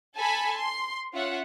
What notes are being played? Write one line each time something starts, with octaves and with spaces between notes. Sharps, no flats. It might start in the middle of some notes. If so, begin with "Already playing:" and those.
A4 G#5 A5 B5
C6
C#4 F4 E5 F#5